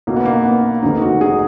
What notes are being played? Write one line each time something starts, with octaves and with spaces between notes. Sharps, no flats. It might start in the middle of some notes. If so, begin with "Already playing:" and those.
B1 B2 F#3 A#3
B3
A#3
B3
F1 D#2 D#3 D#4
F#4
G#4